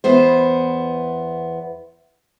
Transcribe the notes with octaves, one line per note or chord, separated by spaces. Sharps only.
E2 B3 C5